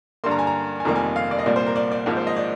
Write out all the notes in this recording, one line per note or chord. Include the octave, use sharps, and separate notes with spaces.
G2 D3 G3 A#3 C6
A#5
G#5
A#5
G#5
F1 F2 D#3 G3 A#3 A#5
G#5
F5
D5
D#5
C2 A#2 G3 A#3 D5
C5
A#4
D5
D5
G#1 G#2 F3 A#3
C5
D#5
D5